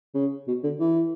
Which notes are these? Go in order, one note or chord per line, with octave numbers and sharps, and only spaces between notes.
C#3
B2
D3
E3